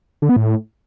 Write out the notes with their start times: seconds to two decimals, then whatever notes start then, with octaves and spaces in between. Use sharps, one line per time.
0.22 D3
0.29 B3
0.36 A2